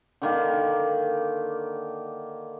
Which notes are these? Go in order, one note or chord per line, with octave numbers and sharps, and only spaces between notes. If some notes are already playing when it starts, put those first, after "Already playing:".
D3 D#3 A#3